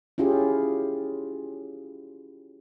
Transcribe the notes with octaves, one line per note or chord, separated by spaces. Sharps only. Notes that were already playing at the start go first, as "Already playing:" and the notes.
C#4 E4 F4 G4 G#4